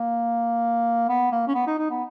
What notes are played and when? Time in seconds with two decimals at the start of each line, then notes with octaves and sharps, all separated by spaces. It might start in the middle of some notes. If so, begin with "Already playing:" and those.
Already playing: A#3
1.09 B3
1.32 A#3
1.47 C#4
1.54 B3
1.67 D#4
1.79 D#4
1.90 B3